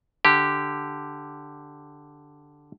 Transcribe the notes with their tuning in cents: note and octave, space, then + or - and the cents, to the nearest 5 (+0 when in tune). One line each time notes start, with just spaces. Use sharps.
D3 +0 G4 +0